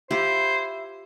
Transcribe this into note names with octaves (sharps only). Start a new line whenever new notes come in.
E4 F4 G4 C5